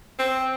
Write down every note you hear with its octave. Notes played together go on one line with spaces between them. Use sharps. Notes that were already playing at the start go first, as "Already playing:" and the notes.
C4